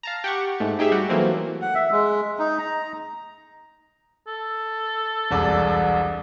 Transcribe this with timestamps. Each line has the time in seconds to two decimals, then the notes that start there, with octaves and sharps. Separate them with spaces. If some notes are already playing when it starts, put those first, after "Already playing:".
0.03 F5 A5 A#5
0.24 G4 F#5 C#6
0.60 G#2 A3
0.79 D#4 G4 G#4 E5
0.92 G3 F#4
1.09 E3 F#3 A3 A#3 C4
1.62 F#5
1.75 E5
1.91 G#3
2.39 D#4
2.59 A#5
4.27 A4
5.31 E1 C2 D5